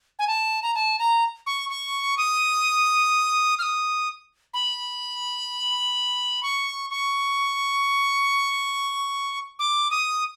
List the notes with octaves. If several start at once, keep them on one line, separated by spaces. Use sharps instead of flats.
G#5
A5
A#5
A5
A#5
C#6
C#6
D#6
F6
D#6
B5
C#6
C#6
D6
D#6